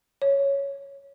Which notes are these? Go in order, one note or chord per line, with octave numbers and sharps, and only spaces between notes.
C#5